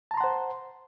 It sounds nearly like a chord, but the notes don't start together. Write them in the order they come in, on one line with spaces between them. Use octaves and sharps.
A5 A#5 C6 F#5 C5